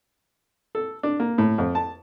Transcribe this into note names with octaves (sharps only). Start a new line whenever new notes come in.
A4
D4
A#3
A2
F2
A5